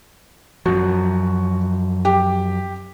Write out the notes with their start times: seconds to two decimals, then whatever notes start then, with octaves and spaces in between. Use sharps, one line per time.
0.66 F#2 F3 F#4
2.05 G4